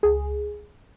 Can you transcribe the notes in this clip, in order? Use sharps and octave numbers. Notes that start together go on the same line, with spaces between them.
C#2 G#4